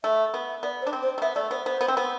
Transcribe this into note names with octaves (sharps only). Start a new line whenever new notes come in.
A3 E5
B3
B3 D5
C5
D4
C4
C5
A3
B3 E5
A3 D5
B3 C5
B3 C5
B3
C4
B3